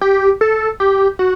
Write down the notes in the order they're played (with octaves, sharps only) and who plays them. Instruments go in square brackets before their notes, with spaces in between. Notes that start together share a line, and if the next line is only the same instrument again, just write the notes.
[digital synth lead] G4
A4
G4
F#4